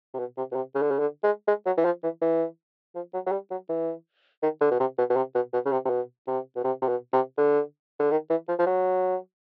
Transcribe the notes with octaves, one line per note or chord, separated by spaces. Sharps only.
C3
B2
C3
B2
C3
C#3
D3
C#3
D3
G#3
G#3
F#3
E3
F3
E3
E3
F3
F#3
F#3
G3
F#3
E3
D#3
D3
B2
C3
B2
B2
C3
B2
B2
C#3
C3
C3
B2
C3
B2
C3
C3
B2
C3
D3
D3
D#3
E3
F3
F3
F#3